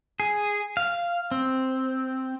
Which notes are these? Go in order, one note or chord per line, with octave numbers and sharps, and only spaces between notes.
G#4
F5
C4